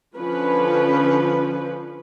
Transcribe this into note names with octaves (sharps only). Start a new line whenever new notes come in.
D3 F3 C#4 B4